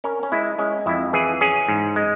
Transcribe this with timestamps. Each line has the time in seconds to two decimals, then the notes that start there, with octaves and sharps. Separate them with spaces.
0.04 C#4 A#4
0.23 C#4
0.32 G#3 E4
0.59 G#3 C#4
0.86 F2 E4
1.13 E3 G#4
1.41 C#4 G#4
1.69 G#2
1.96 G#3